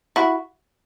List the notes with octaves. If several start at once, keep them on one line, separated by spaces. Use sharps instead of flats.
E4 F#4